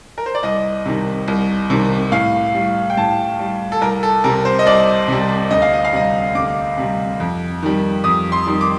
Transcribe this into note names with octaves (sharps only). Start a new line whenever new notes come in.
A#4
C5
D5
C2 D#5
C3 D#3 G3
C2
C3 D#3 G3
A2 F5
G3
G5
A2 A5
G3
A4
C2 A#4
A4
C3 G3 A#4
C5
D#5
C2 D5
C3 G3
D2 D#5
F5
D#5
F5
C3 G3 D#5
D2 D6
C3 G3
F2
D#3 G3
F2 D#6
C6
D#3 G3
D6